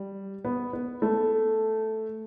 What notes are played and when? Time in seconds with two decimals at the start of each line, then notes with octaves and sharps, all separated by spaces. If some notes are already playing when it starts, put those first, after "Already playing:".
Already playing: G3
0.45 B3
0.73 B3
1.02 A3